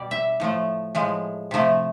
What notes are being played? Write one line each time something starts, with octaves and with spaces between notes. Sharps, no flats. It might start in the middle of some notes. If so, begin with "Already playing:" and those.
Already playing: B2 G3 D5
E5
A2 F3 A3
A2 F3 G#3
C3 F3 A3